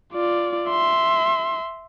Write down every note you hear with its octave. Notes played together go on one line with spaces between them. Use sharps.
F4 D5
E5 C6